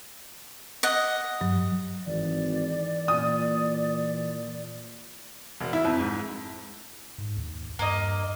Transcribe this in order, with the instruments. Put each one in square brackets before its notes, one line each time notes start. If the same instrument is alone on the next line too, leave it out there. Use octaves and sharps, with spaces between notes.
[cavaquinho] D#5 F#5
[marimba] G2 F#3
[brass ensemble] G#1 [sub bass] E3 [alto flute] D5
[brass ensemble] A#2 [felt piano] D#6
[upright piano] E1
E4
F2
G#2
[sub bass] G#2
D#2
[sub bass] G2 [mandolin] A#3 D#5